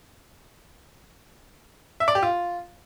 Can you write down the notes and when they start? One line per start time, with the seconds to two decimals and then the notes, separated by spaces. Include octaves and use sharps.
2.00 E5
2.08 D5
2.15 G4
2.23 F4